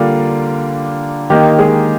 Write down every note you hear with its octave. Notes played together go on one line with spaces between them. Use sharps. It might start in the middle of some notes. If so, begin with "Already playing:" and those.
Already playing: D3 G3 A#3 D4 F4
D#3 A#3 D#4 G4
G#3 G#4